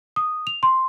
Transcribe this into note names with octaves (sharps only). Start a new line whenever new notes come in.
D#6
F7
C6